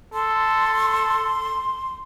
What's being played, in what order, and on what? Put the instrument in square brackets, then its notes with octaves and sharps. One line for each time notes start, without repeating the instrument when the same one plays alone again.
[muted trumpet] A4 [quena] C6